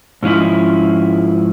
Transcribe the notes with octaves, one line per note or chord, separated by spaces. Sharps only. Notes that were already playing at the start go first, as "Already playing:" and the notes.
G#2 F3 C#4 E4